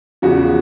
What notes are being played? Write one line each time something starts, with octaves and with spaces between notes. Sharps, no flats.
E2 C#3 F3 F#4